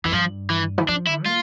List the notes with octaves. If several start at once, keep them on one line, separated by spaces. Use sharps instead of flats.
F2 E3
G2 F3
E3
E3
F3 D4
D3 E4
A#3 F4